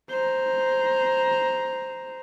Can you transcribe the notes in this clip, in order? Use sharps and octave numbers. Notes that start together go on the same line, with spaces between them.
C5 A#5